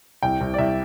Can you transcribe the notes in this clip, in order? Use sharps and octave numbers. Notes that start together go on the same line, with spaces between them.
C2 G5
C2
D5
C2 E5